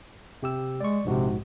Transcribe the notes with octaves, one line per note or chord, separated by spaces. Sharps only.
C3 G4 E6
G#3 D5 C#6
A#1 G#2 C3 F#4